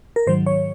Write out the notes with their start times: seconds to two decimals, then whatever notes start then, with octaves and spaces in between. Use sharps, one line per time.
0.16 A#4
0.27 G#2 D#3 F#3 C5
0.46 C#5